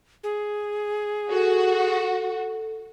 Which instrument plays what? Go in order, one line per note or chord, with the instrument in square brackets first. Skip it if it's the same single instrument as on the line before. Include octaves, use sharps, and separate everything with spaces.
[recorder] G#4
[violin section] F#4 [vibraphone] A4